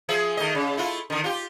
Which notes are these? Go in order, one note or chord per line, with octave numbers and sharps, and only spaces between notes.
F3 G#4 E5
D#3 A3 D#5
C#3
A3 E4 F4
D3 D#3
F4 G4